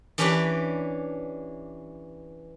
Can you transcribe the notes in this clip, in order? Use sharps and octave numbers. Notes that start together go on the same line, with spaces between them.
E3 C#4 D4 G4 B4 D5